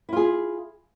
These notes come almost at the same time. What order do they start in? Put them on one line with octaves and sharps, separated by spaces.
E4 F4 G#4